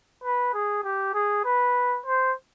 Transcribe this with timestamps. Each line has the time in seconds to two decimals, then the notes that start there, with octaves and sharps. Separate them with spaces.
0.23 B4
0.54 G#4
0.83 G4
1.14 G#4
1.45 B4
2.06 C5